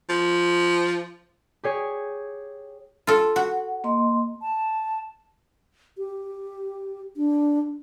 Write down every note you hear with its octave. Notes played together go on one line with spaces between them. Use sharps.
F3
G4 G#4 C#5
F4 A4
F#4 F#5
A#3 D#5 C6
A5
G4
D4